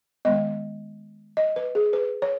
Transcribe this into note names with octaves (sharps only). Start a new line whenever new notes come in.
D#3 G#3 B3 D#5
D#5
B4
G#4
B4
C#5